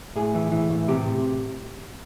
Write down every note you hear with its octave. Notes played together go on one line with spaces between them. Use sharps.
A2 G#4
E3
E3
A2
C3 G4